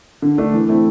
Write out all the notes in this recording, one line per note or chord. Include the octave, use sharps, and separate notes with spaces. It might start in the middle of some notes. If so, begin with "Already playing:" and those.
D3
A3 D4
E3
A3 C4 E4